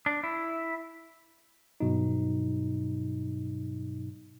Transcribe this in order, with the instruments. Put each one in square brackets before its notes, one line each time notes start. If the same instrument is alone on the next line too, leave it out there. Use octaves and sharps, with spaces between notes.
[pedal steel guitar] D4
E4
[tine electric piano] G2 B2 F#3 D#4